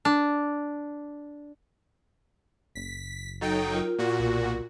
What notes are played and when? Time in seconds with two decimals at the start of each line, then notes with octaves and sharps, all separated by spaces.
0.05 D4
2.75 F#1 B6
3.41 F#3 D#4 A4 G5
3.74 F4 A#4
3.99 A#2 F#4
4.19 B1